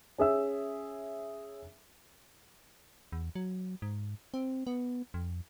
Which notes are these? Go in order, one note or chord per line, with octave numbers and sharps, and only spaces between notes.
C#4 G#4 E5 E6
E2
F#3
G#2
C4
B3
F2